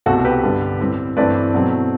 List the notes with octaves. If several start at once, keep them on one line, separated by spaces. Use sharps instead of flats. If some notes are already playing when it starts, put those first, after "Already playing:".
C2 B2 A3 C4 F#4 A4
G4 B4
G2 D3 G3 B3
A2 G3 C4
G2 E3 A3 C4 B4 D5
B2 F#3 A3 C4